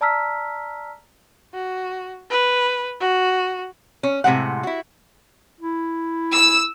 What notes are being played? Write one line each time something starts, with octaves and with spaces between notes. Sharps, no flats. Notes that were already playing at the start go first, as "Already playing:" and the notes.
D5 A5 A#5 E6 F6 B6
F#4
B4
F#4
C#4
A2 C3 G#3 F#5
E4 F#4
E4
E6